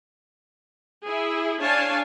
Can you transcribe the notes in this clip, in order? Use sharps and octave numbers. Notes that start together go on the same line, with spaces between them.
E4 G#4
D4 C#5 F5 G#5 A5